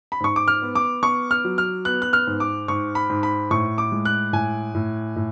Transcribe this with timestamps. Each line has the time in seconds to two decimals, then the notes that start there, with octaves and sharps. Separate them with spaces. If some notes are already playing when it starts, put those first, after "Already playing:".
0.12 B5
0.20 G#2 C#6
0.36 D6
0.48 F6
0.62 B3
0.75 D6
1.03 B3 C#6
1.31 F6
1.44 F#3
1.58 F6
1.85 B3 F#6
2.02 F#6
2.13 F6
2.27 G#2
2.40 D6
2.68 G#2 C#6
2.95 B5
3.10 G#2
3.23 B5
3.51 A2 C#6
3.78 D6
3.92 G#3
4.05 F#6
4.33 A2 G#5
4.75 A2
5.16 A2